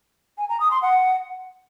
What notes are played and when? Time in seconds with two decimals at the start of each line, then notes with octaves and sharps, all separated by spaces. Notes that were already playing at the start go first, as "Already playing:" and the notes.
0.38 G#5
0.49 A#5
0.60 D#6
0.71 C6
0.82 F#5